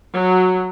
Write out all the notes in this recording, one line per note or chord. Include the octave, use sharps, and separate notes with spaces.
F#3